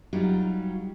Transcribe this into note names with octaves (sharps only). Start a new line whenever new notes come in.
F#3 G3 D#4 F4 G4